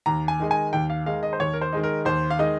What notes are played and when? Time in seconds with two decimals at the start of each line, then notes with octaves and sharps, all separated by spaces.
0.06 D#2 A#5
0.28 G#5
0.40 D#3 G#3 D#4
0.51 G#5
0.73 D#2 G5
0.90 F5
1.06 D#3 G#3 D#4 F5
1.23 D#5
1.33 C5
1.39 D#2 C#5
1.53 A#4
1.61 C5
1.73 D#3 G#3 D#4
1.84 A#4
2.05 D#2 C5
2.30 F5
2.39 D#3 G#3 D#4 D#5